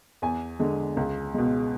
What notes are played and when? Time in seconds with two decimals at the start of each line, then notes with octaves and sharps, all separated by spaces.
0.22 E2 G#5
0.59 D3 G#3
0.97 C#2
1.34 B2 G#3